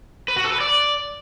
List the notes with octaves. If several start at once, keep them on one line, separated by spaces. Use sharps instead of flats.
B4
F#4
A4
B4
D5